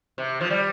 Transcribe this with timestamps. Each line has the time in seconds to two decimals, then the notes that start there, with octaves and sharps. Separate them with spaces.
0.18 C3
0.41 F3
0.50 G3